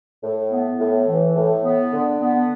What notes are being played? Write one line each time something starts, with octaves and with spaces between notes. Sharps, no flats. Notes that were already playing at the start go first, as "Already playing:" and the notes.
A2
B3
A2
E3
A2
B3
D3
B3